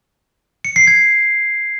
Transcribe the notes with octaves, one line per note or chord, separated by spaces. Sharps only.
C#7
C7
G#6